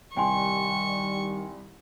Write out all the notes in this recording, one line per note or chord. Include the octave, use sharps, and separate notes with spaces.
C2 D#3 G3 G5 G#5 C6 C#6